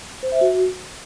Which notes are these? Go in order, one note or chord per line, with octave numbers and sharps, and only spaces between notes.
C5
E5
F#4